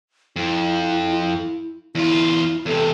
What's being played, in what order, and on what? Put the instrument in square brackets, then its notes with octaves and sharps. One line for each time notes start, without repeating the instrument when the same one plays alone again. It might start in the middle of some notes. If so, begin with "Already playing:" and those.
[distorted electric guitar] F2 [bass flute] E4
[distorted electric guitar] E2 F4 [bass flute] E4
[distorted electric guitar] E2 C3 [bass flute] A4